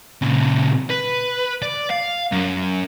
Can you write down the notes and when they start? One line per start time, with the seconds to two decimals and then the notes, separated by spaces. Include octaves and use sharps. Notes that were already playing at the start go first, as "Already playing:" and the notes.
0.22 A#2 C#3
0.90 B4
1.62 D5
1.90 F5
2.32 F#2